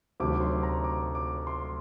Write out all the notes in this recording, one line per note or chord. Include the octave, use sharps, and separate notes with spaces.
D2 C3 D#3 F#3 D6
C6
A#5
D6
D6
C6